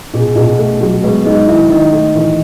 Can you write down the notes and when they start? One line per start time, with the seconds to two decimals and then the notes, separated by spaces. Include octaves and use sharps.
0.14 B2 G#4
0.35 B2
0.58 A3
0.81 F#3
1.03 G#3 B3 B4
1.25 G#3 D#4 D#5
1.47 D#3 E4 E5
1.69 D#3 D#4 D#5
1.92 A3
2.15 E3